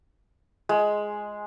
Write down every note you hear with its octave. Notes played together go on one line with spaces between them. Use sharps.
G#3